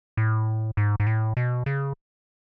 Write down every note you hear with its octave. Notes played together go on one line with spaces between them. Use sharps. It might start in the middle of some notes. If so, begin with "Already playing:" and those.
A2
G#2
G#2
A2
B2
C#3